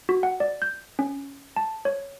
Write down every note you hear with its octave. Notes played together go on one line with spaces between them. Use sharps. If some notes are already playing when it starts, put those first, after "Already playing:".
F#4
F#5
D5
G6
C#4
A5
C#5